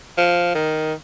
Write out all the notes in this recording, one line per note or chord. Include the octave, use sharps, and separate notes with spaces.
F3
D#3